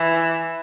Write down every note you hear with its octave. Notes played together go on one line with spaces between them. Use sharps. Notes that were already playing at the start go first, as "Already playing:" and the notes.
Already playing: E3